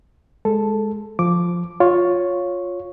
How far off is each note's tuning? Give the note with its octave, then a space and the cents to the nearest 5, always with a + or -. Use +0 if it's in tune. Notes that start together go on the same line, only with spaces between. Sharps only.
G#3 +0 A4 +0
F3 +0 D6 +0
F4 +15 C#5 +0